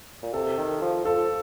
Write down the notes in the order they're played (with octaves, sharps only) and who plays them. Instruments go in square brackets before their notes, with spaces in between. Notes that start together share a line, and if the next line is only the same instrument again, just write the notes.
[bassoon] A#2
[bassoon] C3 [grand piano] A4
[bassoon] D#3
F3
[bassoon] F3 [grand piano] A4